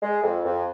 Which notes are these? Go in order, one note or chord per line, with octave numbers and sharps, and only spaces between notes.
G#3
F2
F2